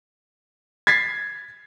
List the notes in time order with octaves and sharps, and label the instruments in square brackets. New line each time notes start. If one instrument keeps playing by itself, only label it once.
[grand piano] G#6 A6 B6 C7